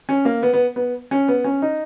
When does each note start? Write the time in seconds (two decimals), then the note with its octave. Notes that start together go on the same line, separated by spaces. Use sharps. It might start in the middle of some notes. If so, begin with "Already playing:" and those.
0.09 C#4
0.25 A#3
0.43 B3
0.54 B3
0.76 B3
1.11 C#4
1.28 B3
1.44 C#4
1.62 D#4